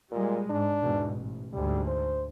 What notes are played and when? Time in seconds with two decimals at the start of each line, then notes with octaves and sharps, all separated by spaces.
0.11 A#2 G3 G#3
0.50 G#2 D4
0.81 E2 G#2 B2
1.15 A1
1.53 D2 G#2 G3
1.87 C5